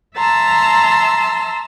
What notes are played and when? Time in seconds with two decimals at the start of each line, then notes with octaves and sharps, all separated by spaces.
0.18 E5 A5 A#5 C6 E6